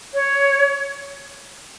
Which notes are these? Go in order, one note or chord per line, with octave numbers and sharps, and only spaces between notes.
C#5